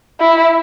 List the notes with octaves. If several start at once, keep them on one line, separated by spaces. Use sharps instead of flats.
E4